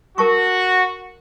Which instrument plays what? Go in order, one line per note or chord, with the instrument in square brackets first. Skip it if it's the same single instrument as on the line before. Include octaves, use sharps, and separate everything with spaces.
[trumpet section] F#4 [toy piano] A#4 A5 C#6